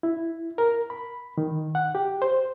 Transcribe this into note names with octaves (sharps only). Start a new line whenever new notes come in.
E4
A#4
B5
D#3
F#5
G4
C5